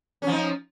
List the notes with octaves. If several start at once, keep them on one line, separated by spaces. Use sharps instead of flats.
F3 C#4 D#4